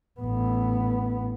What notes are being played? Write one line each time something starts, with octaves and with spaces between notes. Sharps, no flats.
A1 B3